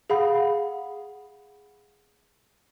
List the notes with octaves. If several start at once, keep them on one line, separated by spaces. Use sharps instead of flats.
G#4 F5 F#5 B5